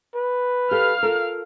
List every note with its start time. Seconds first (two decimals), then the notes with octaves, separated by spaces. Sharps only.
0.15 B4
0.71 G4 A4 F5 F6
1.03 F4 A4 A#4